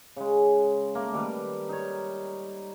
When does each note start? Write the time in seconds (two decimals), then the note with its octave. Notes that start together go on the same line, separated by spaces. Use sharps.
0.16 C#3 G#3
0.95 A3 A#3
1.13 D#3 G3 A#4 B4
1.69 D#4 C#5